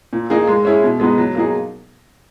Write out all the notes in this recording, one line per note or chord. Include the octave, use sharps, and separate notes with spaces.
A#2
A#3 D#4 G#4
G#3
C#4 E4 G#4
B2
G#3 B3 D#4
F#3
A#3 D#4 G#4